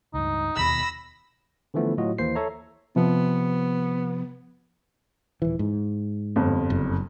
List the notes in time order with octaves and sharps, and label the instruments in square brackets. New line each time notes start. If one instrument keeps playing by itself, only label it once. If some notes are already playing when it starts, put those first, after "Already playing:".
[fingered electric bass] C#2 G2 [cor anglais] D#4
[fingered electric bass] E1 D#2 B2 [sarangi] B5 [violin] E6 A#6
[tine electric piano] D3 E3 F3 A3 B3
A2 F#3 F4 F#4 D#5
D#2 E3 A#3 C5 C7
A4 C#5 E5 A#5
[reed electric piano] C3 F3 [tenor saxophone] B3
[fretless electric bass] D#1 E3
G#2
[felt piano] G1 F2
[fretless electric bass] F#1